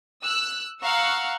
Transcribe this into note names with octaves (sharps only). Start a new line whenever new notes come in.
E6 F#6
F5 F#5 A#5 C#6 E6